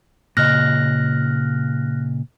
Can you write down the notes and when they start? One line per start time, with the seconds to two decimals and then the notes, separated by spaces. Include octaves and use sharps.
0.37 A#2 C#3 D#5 F6 F#6 A#6